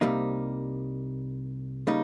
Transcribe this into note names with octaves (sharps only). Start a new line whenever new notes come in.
C2 C3 G3 A#3 D#4
C#3 G3 A#3 D#4